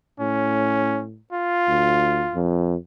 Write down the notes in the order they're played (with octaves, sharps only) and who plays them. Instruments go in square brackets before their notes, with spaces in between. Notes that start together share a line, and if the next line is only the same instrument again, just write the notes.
[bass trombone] A2 [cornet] C#4
[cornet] F4
[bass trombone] D2
F2